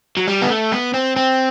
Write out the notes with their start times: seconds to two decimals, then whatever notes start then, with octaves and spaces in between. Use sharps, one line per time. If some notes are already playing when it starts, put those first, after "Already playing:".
0.17 F#3
0.27 G3
0.42 B3
0.49 A3
0.72 B3
0.94 C4
1.16 C4